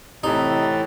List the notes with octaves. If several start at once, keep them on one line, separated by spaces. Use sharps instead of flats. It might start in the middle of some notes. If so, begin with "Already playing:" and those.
A2 C3 E3 D#4 A6